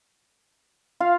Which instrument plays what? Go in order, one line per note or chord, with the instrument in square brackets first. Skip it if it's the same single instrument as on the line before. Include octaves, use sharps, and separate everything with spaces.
[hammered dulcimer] F4 [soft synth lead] F5